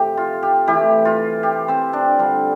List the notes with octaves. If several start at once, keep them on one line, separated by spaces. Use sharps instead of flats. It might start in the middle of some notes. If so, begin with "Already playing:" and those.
Already playing: C3 F3 A3 C4 G4
F4
G4
E3 A3 E4 G4
F4
G4
C4 C5
D4 D5
D3 G3 D4 F4